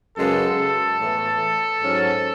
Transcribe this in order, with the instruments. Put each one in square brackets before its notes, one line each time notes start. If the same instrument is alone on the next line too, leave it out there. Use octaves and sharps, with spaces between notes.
[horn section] F#2 C#3 G#3 B3 A4
A2 E3 B3
G#2 F#3 C#4